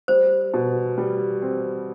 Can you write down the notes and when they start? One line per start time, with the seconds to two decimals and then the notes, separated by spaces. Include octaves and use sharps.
0.08 G3 C5
0.54 B2
0.98 G3
1.42 C4